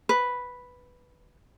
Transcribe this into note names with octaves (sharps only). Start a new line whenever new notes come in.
B4